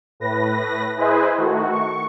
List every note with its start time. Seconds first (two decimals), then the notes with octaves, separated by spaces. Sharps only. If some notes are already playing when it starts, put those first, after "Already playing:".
0.20 A2 B4 A#6
0.96 E4 G#4 B4 C5 D#5 G#5
1.38 D#3 A3 F#4
1.70 C#6